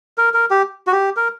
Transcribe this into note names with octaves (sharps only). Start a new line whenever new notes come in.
A#4
A#4
G4
F#4
G4
A#4